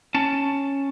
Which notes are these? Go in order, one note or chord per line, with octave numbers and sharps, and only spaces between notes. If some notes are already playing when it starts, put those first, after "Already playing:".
C#4 A5